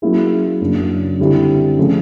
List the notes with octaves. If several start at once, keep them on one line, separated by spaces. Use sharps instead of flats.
F#3 A#3 C#4 E4 G#4
F#2 C#3 F#3 A#3 D4
D3 G3 C4 E4
C#3 F3 A3